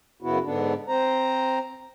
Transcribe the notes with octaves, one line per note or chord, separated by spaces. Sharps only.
F#2 C#3 B3 E4 F#4
G#2 D3 B3 D4
C4 C5 A#5